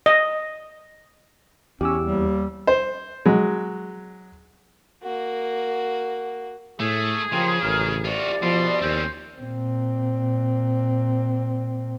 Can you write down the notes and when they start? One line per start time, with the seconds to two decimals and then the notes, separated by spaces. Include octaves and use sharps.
0.06 D#5
1.81 E2 C#4 G4 D6 E6
2.04 D#2 G3
2.67 C5
3.26 F#3 G#3
5.03 A#3 F#4
6.80 A2 A3 G#4
7.33 C#3 F3 A#3 G4 C6
7.63 A1 F#2 A#4 F6
8.05 C2 F4 F#4 D5
8.42 B2 F3 C6
8.81 D#2 C4 C#4 C5
9.39 A#2 C4